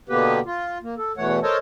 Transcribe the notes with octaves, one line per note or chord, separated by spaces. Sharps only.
B2 D3 A#3 B3 G4 B4
F4
A#3
A4
E2 B2 E3 A3 C#5 F#5
A4 A#4 C5 C#5 D#5 A5